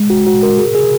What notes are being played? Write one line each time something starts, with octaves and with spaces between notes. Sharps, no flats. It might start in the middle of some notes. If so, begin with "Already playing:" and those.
Already playing: G#3
F#4
F#4
A#4
G#4
G#4